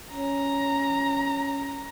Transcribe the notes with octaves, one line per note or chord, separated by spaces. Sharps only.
C#4 A#5